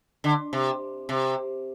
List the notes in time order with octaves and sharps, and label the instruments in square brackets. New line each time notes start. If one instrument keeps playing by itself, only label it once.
[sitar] D3
C3
C3